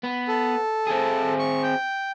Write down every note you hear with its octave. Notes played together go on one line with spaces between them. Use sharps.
B3
A4
C4 G#4
C#6
G5